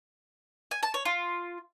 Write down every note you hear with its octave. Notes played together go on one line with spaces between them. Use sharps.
G#5
A5
C#5
F4